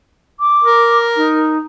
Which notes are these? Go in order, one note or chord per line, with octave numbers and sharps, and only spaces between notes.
D6
A#4
D#4